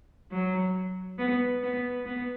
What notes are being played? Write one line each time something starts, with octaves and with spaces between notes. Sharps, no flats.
F#3
B3
B3
B3